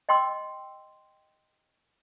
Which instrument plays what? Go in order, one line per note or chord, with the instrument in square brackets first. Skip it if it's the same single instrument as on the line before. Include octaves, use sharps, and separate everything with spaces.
[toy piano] D#5 G5 C6 D6 E6